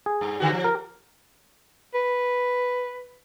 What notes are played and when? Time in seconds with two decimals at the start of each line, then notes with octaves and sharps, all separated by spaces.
0.06 G#4
0.21 G2
0.40 D3 D#3 F#4
0.52 F3
0.64 A#4
1.94 B4